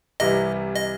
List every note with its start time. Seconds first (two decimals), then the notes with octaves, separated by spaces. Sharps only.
0.20 C2 C3 E3 G3 D#5
0.75 D#5